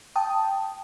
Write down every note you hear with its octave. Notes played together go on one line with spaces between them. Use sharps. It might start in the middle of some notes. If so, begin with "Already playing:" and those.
G5 A5 D#6